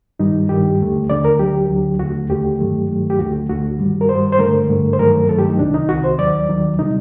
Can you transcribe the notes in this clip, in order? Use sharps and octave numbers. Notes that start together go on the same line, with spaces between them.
G2 D#3 G3 D#4
G2 D#3 G3 G4
D#2 D3 A3
D#2 D3 A3 D5
A#4
D2 D3 F#3 G4
D2 D3 F#3
D#2 D3 A3 F#4
D#2 D3 A3 G4
G2 D#3 F#3 A3
G2 D#3 F#3 A3
G4
D2 D3 A3 F#4
D2 D3 A3 F#4
G2 D#3 G3
A#4
G2 D#3 G3 C5
C5
G2 D3 A3 A#4
G2 D3 A3
C5
G2 D#3 F#3 A3 A#4
G2 D#3 F#3 A3 A4
G4
D#4
C2 C3 D#3 D4
D#4
C2 C3 D#3 F#4
C5
D#2 D#3 F#3 D5
D#2 D#3 F#3
C3 G3 D#4